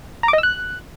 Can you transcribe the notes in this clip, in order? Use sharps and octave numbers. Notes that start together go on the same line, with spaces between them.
A#5
D6
D#5
E6
F#6